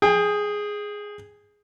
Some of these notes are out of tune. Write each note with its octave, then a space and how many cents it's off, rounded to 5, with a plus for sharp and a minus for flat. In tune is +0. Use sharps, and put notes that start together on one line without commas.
G#4 +0 G5 +30